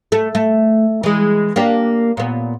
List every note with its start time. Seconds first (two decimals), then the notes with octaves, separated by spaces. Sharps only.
0.12 A3
0.35 A3
1.03 E3 G#3
1.56 A#3 D4 G4
2.17 A#2 B3